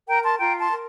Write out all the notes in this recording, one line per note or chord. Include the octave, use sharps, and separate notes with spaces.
A#4 G5 A#5
A5 C6
F4 G5 A#5
A5 C6
A#4